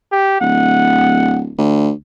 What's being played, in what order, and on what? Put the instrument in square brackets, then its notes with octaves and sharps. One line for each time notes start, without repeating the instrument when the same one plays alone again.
[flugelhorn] G4
[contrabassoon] D1 [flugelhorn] F#5
[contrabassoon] D2